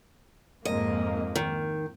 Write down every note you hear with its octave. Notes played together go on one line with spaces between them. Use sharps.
F2 G#2 A#3 D#5
D#3